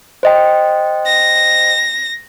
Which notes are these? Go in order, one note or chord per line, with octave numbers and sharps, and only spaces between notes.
C5 D#5 G5
A#6